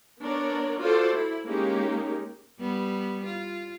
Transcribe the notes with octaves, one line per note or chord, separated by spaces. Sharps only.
B3 D4 A#4 C#5 D5
F4 F#4 A4 C5 D5
E4
G#3 A#3 C#4 D#4 G4
G3 B3
F4